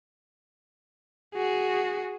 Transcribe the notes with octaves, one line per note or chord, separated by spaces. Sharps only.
F#4 G#4